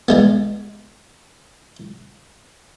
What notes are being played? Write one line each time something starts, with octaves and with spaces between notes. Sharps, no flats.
G3 G#3 B3